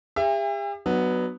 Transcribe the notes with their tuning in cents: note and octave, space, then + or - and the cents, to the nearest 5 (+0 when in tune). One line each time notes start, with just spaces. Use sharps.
G4 +45 E5 +30 G#5 -45
F#3 +0 B3 +0 D4 +40